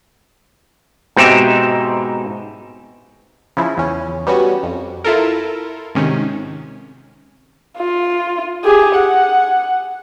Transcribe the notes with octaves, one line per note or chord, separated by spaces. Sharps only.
G#2 B2 C4 D#4 G4 E5
C#3 F3 E4
E2 C#4
G3 B3 C#4 F#4
F2
E4 F4 A4 A#4
G#2 C3 D#3 C#4
F4
G4 G#4
F#5